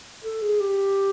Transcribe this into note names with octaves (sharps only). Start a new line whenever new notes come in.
A4
G#4
G4